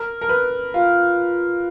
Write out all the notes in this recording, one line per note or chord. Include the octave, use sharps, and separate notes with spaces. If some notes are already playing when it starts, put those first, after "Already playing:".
Already playing: A#4
A#4
B4
F4